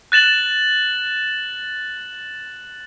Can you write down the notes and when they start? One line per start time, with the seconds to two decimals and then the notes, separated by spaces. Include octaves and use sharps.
0.12 F#6 A6 E7 F#7